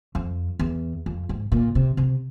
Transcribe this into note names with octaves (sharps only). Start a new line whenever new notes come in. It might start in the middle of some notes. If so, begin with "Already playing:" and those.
F2
E2
F2
G#2
A#2
C3
C3